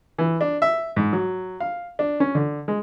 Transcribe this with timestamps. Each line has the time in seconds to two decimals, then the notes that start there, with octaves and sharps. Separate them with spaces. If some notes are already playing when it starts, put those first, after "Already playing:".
0.18 E3
0.41 D4
0.62 E5
0.96 G#2
1.13 F#3
1.60 F5
1.99 D4
2.20 C#4
2.35 D3
2.68 G#3